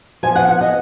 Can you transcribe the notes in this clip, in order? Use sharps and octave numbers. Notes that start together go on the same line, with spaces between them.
F3 G#5
F#5
F2
F#5
D#5